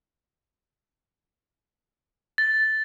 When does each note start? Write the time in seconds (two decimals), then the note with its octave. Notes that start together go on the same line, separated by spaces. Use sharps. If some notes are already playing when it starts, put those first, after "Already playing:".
2.38 A6